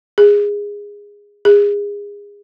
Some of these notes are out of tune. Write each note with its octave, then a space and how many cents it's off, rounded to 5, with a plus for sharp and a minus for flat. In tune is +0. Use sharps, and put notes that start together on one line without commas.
G#4 -15
G#4 -25